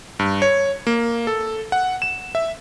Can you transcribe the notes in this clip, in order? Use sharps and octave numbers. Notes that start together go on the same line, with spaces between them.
G2
C#5
A#3
A4
F#5
E7
E5